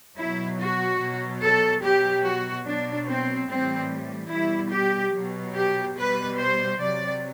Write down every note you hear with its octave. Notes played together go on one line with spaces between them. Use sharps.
B2 F#3 E4
F#4
B2 F#3
A4
B2 F#3 G4
F#4
B2 F#3 D4
C4
A2 E3 G3 C4
B2 G3 E4
G4
B2 F#3
G4
B2 G3 B4
C5
C3 F#3 D5